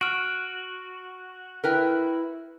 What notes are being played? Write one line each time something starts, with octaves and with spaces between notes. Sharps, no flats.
F#4 F6 D7
E4 A#4 B4 G5